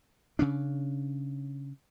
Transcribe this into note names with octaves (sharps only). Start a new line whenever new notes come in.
C#3 C#4 D4